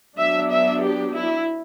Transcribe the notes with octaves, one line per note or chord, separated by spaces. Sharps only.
F#3 B3 D4 E5
E5
G4
E4